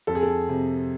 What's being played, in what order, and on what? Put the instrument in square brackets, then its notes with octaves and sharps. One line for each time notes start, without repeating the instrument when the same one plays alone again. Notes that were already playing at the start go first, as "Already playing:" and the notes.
[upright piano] F2 A4
G#4
A4
C3